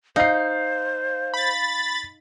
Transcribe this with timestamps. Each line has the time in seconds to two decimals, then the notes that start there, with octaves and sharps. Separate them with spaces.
0.16 D#4 C5 F5 C7
1.34 B5 A6